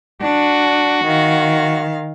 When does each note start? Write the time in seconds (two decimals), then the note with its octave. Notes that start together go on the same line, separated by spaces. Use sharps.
0.21 D4 F#4
1.05 D#3 F5